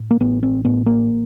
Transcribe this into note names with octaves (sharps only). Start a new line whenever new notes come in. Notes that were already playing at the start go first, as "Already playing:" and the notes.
Already playing: A2
A#3
A1 B3
C4
A2 B3
A#3